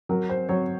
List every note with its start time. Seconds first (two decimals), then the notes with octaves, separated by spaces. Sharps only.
0.09 F#3 A#4
0.30 C5
0.49 F#3 C#5